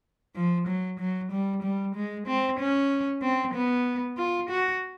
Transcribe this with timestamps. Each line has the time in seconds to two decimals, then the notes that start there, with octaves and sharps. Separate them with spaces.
0.35 F3
0.67 F#3
0.99 F#3
1.31 G3
1.63 G3
1.95 G#3
2.27 C4
2.59 C#4
3.22 C4
3.54 B3
4.17 F4
4.50 F#4